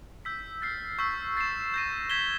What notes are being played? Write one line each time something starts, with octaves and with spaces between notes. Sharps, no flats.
E6 G6 B6
F6 A6 C7
C#6 E6 G6 B6
A6 C7 E7
G6 A#6 D#7
G#6 B6 E7 G7